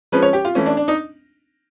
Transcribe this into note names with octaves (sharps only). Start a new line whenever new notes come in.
F3 G#3 C#4 B4
C#5
G4
F4
E3 A3 C#4
D4
D4
D#4